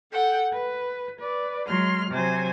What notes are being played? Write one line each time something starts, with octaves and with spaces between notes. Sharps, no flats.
A4 F#5 G5
B4
B4 D5
F#3 G#3 C6 F6
C3 F#3 C5 G#5